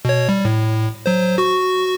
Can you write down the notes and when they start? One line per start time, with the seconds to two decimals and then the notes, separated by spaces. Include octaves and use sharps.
0.05 B2 C#5
0.29 G3
0.45 A2
1.06 F#3 C5
1.38 F#4 C#6